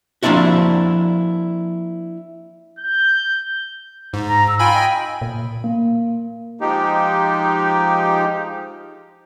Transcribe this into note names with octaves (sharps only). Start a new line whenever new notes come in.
F3 A#3 C4 D4 E4 F#4
G6
G#2
A#5
E6
F4 G5 G#5 B5
D#5
A#2
A#3
F3 G#3 D#4 G4